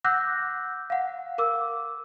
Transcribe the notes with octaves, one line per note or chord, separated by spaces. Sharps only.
F#5 D6 E6 F#6 G6 A#6
F5 F#5
A#4 D6 E6